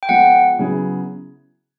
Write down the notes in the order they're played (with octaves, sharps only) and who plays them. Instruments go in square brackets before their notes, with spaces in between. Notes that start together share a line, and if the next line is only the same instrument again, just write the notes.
[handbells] G5
[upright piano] F3 G#3 B3 [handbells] F#5
[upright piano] C#3 F#3 B3 E4 G#4